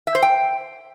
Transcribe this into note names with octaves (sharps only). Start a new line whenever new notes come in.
E5
C5
G5